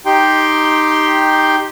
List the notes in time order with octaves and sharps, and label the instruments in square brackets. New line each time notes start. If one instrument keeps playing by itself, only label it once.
[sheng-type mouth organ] D#4 G4 G5 C6